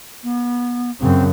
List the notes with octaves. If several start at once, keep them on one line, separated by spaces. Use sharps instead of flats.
B3
F#2 C#3 C4